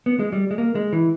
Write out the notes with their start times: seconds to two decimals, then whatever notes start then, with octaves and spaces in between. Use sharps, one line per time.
0.06 B3
0.19 G#3
0.32 G3
0.51 G#3
0.58 A#3
0.75 G#3
0.93 E3